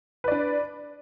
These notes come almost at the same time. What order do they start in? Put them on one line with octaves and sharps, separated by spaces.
B4 D5 D4